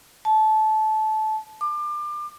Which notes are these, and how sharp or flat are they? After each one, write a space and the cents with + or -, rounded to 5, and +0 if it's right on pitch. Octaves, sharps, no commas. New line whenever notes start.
A5 -20
D6 +30